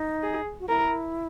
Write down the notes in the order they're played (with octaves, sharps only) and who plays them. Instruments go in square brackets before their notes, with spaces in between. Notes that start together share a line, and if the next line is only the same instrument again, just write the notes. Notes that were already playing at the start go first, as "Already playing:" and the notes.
Already playing: [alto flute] D#4
[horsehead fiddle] G#4
[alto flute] F#4
[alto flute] E4 [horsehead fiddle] A#4